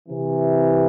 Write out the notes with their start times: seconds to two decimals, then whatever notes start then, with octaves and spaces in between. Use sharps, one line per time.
0.09 C3 E3